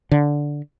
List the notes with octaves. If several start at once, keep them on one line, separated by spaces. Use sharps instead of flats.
D3